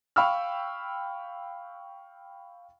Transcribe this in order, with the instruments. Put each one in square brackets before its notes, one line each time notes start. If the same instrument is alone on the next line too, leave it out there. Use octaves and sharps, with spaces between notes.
[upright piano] F5 G5 B5 C#6 E6 F6